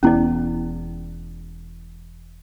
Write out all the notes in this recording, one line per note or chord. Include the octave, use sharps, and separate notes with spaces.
E1 E2 B3 C#4 E4 D5